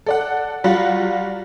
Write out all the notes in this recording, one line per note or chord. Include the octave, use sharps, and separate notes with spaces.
A4 D5 F#5
F#3 G3 F4 F#4 F5 F#5